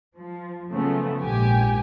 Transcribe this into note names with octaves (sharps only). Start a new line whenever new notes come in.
F3
C#3 F3 F#3 A3 B3
A#1 G#2 G4 G#5